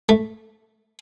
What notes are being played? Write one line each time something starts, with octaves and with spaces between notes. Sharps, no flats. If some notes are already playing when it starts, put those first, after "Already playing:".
A3